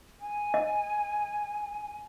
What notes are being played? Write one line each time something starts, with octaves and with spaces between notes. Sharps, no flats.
G#5
D#5